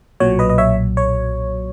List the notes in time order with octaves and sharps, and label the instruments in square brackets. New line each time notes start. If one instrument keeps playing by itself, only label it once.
[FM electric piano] B1 A#2 F#3 C#5
B4 D#5
D#5
C#5 E5
C#5